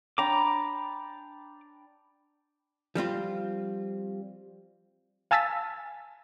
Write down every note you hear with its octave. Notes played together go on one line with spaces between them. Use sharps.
D4 G5 A#5 B5 D6
F3 G3 C4 F4
F5 G#5 A5 E6 A6 B6